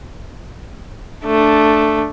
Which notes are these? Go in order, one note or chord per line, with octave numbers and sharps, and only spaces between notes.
A3 D4